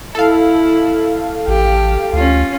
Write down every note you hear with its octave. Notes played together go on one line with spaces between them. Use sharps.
E4 A4 F5
A1 G4
D2 C#4 F4